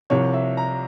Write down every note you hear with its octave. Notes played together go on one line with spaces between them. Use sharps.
C2 C3 F3 C#5
E5
A#5